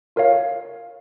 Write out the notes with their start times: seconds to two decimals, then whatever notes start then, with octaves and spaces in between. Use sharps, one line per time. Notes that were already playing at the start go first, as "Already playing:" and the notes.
0.16 F4 A#4 C#5 F5